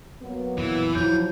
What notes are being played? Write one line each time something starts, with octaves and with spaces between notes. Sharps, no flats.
F#3 A#3 B3
F2 A#2 E3
F3 F#3 E4 G6